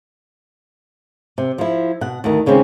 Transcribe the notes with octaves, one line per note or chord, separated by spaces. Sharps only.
C3
F3 E4
B2 F#5
D2 D#3
D#2 C#3 G#3 C4 C#4